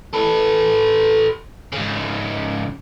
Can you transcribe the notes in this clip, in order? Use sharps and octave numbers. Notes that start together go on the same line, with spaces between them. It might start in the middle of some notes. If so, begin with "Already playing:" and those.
A4 B4
G#2 C#3